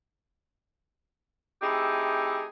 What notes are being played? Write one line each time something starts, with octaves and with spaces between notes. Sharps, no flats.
A3 C4 D#4 E4 G4 G#4